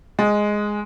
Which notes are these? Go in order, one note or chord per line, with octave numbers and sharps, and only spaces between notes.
G#3